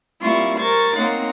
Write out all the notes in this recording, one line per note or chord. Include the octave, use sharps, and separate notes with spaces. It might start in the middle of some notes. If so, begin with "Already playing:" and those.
G3 A#3 C4 E4 F4 C#6
A#4 C5 C#6 G#6 A6
A#3 C4 D#4 C#5 F#5